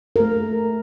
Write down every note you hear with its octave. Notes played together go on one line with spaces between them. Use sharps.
A3 A#4